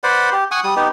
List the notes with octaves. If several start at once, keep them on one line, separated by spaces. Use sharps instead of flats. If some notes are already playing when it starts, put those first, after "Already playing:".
B4 C5 D5 F#5
G4
F#5 G#5 C#6 D#6
G3 D#6
B3 D#4 G4